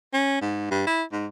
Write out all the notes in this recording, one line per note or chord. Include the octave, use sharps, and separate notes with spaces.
C#4
G#2
G2
E4
G#2